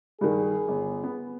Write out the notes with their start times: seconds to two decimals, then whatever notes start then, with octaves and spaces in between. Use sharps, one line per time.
0.21 G2 D#3 G#4
0.68 G1
1.04 B3